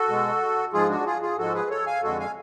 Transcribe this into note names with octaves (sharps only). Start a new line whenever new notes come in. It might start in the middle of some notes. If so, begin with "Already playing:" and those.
Already playing: F#4 A4
B2 G#3
G#2 F3 G#3 F4 G#4
D4 F#4
F4 G#4
F4 G#4
G#2 F3 G#3 F#4 A4
G#4 B4
A4 C#5
F5 G#5
F2 D3 G#3 F#4 A4
F5 G#5